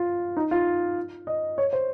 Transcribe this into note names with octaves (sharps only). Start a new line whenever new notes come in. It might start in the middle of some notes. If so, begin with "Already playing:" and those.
Already playing: F4
D#4
F4
D#5
C#5
C5